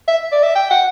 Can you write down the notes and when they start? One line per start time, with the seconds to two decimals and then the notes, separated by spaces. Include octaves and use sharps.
0.08 E5
0.32 D5
0.43 E5
0.55 G5
0.71 F#5